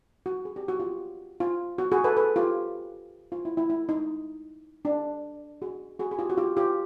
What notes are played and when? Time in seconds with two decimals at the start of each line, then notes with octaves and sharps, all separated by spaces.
0.26 F#4
0.45 G#4
0.56 G4
0.68 F#4
0.80 F4 G4
1.40 F4
1.78 F#4
1.92 F#4 G#4
2.04 A4 B4
2.17 A4 B4
2.36 F4 G4
3.32 F4
3.45 E4
3.57 E4
3.70 E4
3.89 D#4
4.85 D4
5.62 F#4 G#4
5.99 F#4 G#4
6.11 G#4
6.19 F4 G4
6.30 F#4
6.37 F4 G4
6.57 F4 G4